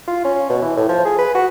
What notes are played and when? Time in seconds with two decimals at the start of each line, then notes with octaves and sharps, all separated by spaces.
0.08 F4
0.25 C#4
0.50 B2
0.62 E3
0.77 A2
0.89 F3
1.05 G#4
1.19 B4
1.35 F#4